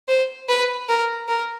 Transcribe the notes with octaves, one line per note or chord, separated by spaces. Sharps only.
C5
B4
A#4
A#4